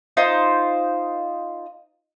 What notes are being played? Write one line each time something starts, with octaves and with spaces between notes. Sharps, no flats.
D#4 F4 C5